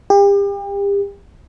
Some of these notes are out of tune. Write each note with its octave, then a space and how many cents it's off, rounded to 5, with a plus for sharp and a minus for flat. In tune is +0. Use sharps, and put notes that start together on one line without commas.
G4 +35